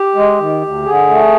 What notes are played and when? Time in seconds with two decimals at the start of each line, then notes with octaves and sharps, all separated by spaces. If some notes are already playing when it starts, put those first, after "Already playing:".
Already playing: G4
0.15 G#3
0.39 D#3
0.62 D2
0.85 D3 G#4
1.09 A3